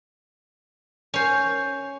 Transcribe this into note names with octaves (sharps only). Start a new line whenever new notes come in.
C#4 C5